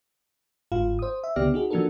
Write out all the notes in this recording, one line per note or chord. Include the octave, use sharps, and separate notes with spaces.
G1 G#2 F4 F5
C5 D#6
E5
C#2 D3 B3 G4 D5 F6
D#4 F#4 G#4
F3 A#3 D4 F#4 A4 A#4